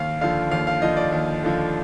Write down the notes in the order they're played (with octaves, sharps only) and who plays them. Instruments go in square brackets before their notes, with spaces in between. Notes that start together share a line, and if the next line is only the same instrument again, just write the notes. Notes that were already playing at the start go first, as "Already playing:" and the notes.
Already playing: [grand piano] D#2 F5
D3 F3 F5
D#2 F5
F5
D3 F3 D#5
D5
D#2
D3 F3